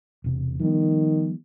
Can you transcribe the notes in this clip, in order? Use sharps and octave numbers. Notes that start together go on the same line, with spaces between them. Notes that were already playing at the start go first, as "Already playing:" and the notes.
E1 C3
D#3 F3 G3 B3